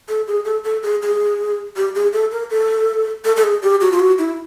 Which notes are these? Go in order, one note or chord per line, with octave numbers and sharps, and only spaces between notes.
A4
G#4
A4
A4
G#4
G#4
G4
G#4
A4
A#4
A4
A4
A4
G#4
G4
F#4
F4
F#4
E4